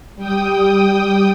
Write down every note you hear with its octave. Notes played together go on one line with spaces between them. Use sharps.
G3 G5 D#6